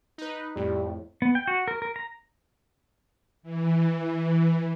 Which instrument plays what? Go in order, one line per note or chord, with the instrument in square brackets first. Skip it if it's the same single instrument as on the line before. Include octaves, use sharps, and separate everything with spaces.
[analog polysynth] D#4 B4
[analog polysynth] F2 A2 [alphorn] G3
[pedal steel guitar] B3
G5
F#4
A#4
A#4
A#5
[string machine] E3